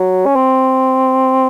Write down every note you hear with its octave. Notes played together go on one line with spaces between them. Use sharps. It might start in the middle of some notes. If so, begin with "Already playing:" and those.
Already playing: F#3
C#4
C4